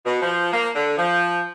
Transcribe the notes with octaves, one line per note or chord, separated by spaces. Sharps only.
B2
F3
A#3
D3
F3